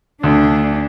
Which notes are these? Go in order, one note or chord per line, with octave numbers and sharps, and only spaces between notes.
D2 D4